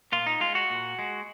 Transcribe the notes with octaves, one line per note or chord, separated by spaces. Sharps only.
A#2 F4
D#4
G#3 F4
F#4
A#2
G#3